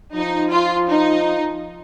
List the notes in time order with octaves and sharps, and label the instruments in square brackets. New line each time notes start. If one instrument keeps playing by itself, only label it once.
[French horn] F3 [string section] D#4
[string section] F4
D#4